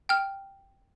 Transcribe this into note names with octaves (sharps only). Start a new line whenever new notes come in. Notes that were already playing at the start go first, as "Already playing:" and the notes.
G5 F6